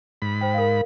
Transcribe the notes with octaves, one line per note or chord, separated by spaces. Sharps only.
G#2 B5
C5 G5
A#4 F5